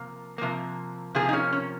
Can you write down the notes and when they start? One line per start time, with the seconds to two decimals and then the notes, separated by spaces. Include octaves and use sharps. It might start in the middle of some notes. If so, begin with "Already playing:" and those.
Already playing: C3 F3 A#3
0.38 C3 F3 A#3
1.15 C3 F3 A#3 G#4
1.29 D#4
1.33 C#4
1.53 C#4